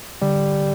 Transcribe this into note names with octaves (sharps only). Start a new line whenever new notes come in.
D3 G3